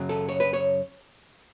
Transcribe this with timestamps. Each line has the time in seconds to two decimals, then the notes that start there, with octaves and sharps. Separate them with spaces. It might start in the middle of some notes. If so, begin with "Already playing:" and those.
Already playing: F#2 C#3 F#3
0.09 A4
0.29 C#5
0.40 B4
0.53 C#5